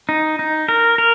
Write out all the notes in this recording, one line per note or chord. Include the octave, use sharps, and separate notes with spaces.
D#4
D#4
A#4
A#4